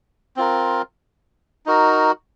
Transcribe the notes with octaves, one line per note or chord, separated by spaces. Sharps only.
C4 F4 A#4
D#4 F#4 A#4